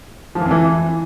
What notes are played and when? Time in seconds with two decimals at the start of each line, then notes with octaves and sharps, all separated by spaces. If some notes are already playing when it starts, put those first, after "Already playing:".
0.35 F3
0.40 E3
0.46 F2
0.51 E3